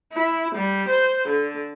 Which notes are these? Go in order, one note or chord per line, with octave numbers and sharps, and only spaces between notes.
E4
G3
C5
D3